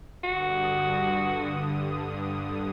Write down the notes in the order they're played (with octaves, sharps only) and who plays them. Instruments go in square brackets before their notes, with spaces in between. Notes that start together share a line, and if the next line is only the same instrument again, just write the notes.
[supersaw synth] G2 D3 D#6 [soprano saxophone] F#4